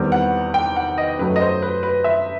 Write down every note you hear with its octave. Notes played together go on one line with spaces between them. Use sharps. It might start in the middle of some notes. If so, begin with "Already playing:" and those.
Already playing: E2 D#3 G3 C4
F#5
G5
F#5
D#5
F#2 F#3 A3 B4
D#5
C5
B4
B4
E5